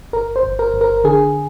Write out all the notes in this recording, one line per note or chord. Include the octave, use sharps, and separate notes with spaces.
G1 A#4
C5
G1
A#4
G1
A#4
D3 G#4